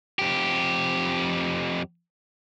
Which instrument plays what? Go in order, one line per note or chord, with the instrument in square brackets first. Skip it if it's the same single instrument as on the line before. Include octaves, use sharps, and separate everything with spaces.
[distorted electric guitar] F2 G4